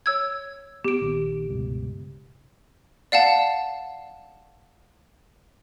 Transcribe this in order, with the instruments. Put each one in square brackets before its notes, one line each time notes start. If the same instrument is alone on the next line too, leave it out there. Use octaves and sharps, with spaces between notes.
[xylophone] C#5 E6 G#6
[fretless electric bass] B3 [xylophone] G4 D7
[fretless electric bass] A#1 D#3
C#2 G2 B2
[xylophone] D5 F5 F#5 A5